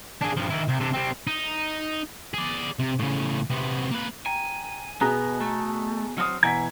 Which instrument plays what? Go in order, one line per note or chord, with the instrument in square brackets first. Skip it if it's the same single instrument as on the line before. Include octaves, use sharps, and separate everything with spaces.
[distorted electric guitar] D4 G#4
G2 F3
D#3 E4
C2
C3 D4
G3 C4
D#4
G#4 D5
C3
A2 C#3
C3 B3
A#3 B4
[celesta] G5 A#5 [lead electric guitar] G#5
[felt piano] B2 G#4 A#5 [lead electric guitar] B3 [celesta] G#5 F#6
[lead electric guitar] A3
[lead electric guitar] F#3 C4 [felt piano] D#6 F6
[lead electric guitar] B2 E3 [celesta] F#5 G#5 A#5 [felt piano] G#6 B6